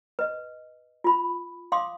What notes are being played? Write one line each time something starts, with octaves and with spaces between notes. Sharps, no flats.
B4 D#5
F4 B5
F5 C6 D6 D#6